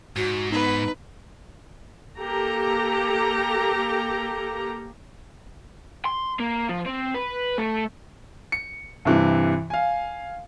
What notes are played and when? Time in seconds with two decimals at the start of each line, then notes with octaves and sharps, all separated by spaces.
0.16 G#2 F#4
0.52 B3 D#4 B4
2.18 A#3 G4 A4 A#5
6.05 C6
6.39 A#3
6.69 F3
6.86 C4
7.14 B4
7.58 A3
8.52 C#7
9.05 G2 C3 E3
9.70 F5 G#5